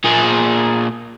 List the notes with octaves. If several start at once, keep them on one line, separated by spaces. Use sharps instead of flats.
A#2 G#4